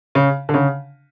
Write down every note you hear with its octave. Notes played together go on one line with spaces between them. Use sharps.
C#3
D3
C#3